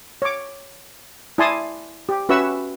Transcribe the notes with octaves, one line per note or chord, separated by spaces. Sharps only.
C#5 D6
E4 D5 G#5 A5 C6 D#6
G4
C#4 F#4 B4 E5 C#6 E6